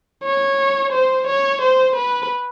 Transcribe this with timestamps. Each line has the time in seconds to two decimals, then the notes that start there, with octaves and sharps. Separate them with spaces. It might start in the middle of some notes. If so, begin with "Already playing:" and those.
0.24 C#5
0.93 C5
1.27 C#5
1.61 C5
1.96 B4